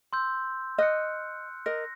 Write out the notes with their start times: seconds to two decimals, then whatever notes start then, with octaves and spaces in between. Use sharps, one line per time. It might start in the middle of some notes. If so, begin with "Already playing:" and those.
0.13 C6 E6 G6
0.78 D#5 F6 F#6 C#7
1.66 A#4 D#5 A#6